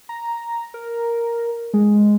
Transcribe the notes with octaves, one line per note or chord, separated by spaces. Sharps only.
A#5
A#4
G#3